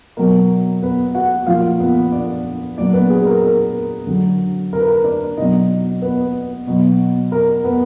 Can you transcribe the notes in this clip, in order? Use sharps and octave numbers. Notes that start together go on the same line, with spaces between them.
B2 F#3 A#4
B3 B4
F#4 F#5
A#2 F3 F4 F5
B3 B4
D4 D5
A#2 F#3 D4 D5
B3 B4
G#4
A#4
A#4
D3 F#3
A#4
B4
A#4
D4 D5
B2 F#3 D#4 D#5
B3 B4
B2 F#3
A#4
B3 B4